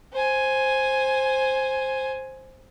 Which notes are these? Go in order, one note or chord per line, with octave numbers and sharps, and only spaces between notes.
C5 G#5